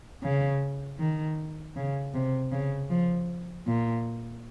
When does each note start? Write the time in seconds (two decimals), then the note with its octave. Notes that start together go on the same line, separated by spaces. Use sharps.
0.23 C#3
0.99 D#3
1.76 C#3
2.14 C3
2.52 C#3
2.90 F3
3.67 A#2